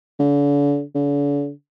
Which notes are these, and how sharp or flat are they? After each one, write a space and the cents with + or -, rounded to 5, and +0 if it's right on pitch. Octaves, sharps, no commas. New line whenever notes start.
D3 -40
D3 -45